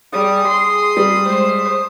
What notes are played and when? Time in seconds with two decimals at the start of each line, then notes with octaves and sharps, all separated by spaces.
0.13 G3 G#4 D#6
0.47 G#4 C6
0.97 G3
1.26 G#3 C5